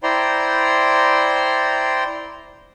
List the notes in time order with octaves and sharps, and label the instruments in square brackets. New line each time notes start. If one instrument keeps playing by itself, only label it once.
[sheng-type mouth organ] E4 C5 D5 G5 A#5 C6